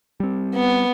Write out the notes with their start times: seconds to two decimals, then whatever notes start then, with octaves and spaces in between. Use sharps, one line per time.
0.20 G3 C4
0.55 B3